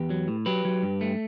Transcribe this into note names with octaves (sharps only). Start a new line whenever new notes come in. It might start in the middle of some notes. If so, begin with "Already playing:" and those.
Already playing: E2 G4 B4
F#3
A2
F#3 G4 B4
F#3
G2
A3